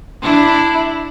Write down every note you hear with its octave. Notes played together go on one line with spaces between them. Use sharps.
D4 E4